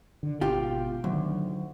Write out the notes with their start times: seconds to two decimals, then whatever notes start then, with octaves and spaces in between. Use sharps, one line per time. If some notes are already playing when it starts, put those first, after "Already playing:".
0.23 D3
0.41 G#1 B2 F4 G4
1.04 D2 D#3 F#3